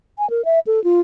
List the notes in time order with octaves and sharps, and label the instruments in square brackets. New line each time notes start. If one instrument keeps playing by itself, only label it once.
[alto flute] G#5
A#4
E5
A4
F4